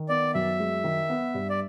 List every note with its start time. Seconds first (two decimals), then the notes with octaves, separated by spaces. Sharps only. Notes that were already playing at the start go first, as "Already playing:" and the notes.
Already playing: D#3
0.09 B3 D5
0.34 F#2 E5
0.60 G#3
0.84 D#3
1.09 B3
1.34 G2
1.50 D5